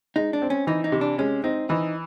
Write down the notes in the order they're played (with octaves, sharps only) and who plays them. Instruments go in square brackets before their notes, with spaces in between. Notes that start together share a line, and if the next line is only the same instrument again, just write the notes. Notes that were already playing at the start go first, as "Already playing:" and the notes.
[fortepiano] G#3 [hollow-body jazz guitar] D#4
[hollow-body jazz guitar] D4
[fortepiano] C4
[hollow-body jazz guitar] C#4
[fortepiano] E3 [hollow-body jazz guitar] D#4
[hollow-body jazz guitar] D#4
[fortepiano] C3
[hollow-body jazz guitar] D4
[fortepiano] G#3 [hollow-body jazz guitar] C#4
[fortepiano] C4 [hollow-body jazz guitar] D#4
[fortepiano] E3 [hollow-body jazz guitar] D#4